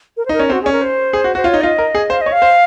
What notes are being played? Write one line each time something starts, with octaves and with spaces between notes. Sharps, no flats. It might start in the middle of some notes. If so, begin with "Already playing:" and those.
A#4
C5
D#4 A#4
C#4
C4
F#4
C#4 G#4
A#4
C5
G#4
F#4
F#4 C5
F4 C#5
D#4
F4 D#5
A#4
G#4
C5 F5
C#5 D#5
F5
C5